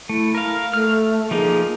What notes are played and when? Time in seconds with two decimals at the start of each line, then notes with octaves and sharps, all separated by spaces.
0.09 A3 E4
0.35 A#4 F5
0.74 A3 F6
1.31 F3 A#3 D#4 G#4